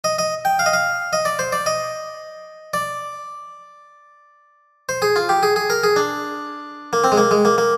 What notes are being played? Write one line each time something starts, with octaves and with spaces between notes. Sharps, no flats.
D#5
D#5
G5
F5
D#5
F5
D#5
D5
C5
D5
D#5
D5
C5
G#4
F4
G4
G#4
G#4
A#4
G#4
D4
A#3
C4
G#3
A#3
G#3
A#3
A#3